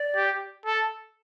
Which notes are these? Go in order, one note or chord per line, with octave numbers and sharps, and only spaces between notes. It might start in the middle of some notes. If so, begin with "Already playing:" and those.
Already playing: D5
G4
A4